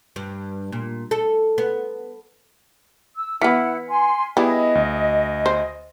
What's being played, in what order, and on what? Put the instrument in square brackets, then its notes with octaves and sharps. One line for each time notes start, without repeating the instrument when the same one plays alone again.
[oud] G2
A#2
A4
B3
[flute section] E6
[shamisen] E3 B3 [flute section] E4 F#5 [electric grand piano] F6 B6 C#7
[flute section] G#5 C6
[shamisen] G3 [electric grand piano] B3 E4 G#4 [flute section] D#5
[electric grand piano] D2
[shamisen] C5